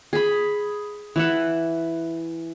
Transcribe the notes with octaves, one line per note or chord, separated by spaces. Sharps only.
G#4 B5
E3 E5 F#5